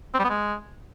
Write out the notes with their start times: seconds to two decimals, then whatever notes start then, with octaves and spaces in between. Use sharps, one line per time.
0.14 C4
0.19 G3
0.24 B3
0.29 G#3